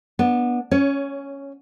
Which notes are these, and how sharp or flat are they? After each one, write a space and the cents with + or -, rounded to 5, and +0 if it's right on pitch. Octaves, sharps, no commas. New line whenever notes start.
B3 -20 D4 +0
C#4 +0 C#5 +20